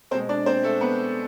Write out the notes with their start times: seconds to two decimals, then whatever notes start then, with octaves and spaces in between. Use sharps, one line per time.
0.11 B2 G#3 C4 C5
0.29 D4 D5
0.46 C4 C5
0.63 A3 A4
0.81 B3 B4